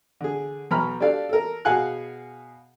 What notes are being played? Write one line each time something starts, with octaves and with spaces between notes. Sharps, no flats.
D3 G#4
B1 B3 A#5 B5 C#6 F6
D4 G4 A4 D5 F5
A4 A#4
B2 G#4 F5 F#5 G#5 F#6